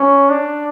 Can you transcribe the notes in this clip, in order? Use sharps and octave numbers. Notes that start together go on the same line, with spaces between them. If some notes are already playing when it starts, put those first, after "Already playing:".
Already playing: C#4
D4